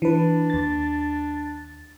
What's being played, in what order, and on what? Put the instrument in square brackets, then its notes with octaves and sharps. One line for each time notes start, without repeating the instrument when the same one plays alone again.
[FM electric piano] E3 B4 [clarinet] D4
[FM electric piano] D#2 A6